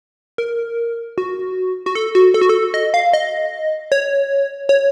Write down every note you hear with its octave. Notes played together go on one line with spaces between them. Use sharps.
A#4
F#4
F#4
A4
F#4
A4
F#4
A4
D#5
F5
D#5
C#5
C#5